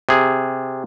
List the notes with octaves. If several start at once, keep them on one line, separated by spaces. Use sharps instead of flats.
C3 G#4